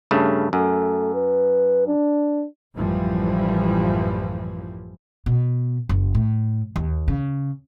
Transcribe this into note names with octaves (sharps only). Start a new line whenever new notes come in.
G2 C#3 A3
F#2 A3
B4
D4
A1 F#2 E3 F3 G3
B2
F#1
A2
D#2
C#3